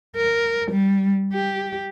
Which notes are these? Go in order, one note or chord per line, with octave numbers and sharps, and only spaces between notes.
A#4
G3
G4